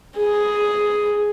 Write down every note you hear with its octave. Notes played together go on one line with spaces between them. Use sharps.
G#4